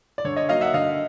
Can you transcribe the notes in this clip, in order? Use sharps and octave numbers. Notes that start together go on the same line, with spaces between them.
D5
D3 C#5
C#5 D#5
F#3 A#3 D#4 D#5 F5
E5 F#5
D3 D#5 F5